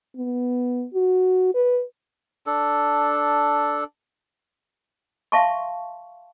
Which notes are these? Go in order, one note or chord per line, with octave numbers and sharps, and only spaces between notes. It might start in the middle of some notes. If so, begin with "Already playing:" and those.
B3
F#4
B4
D4 A4
E5 F5 A5 C6 C#6